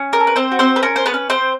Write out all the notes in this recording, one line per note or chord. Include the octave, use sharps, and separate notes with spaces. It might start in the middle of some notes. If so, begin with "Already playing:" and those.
Already playing: C#4
A#4
A4
B4
C4 C5
F#4
C4 C5
B4
C#4 A#4
C5
B3 B4
C#4
C4 C5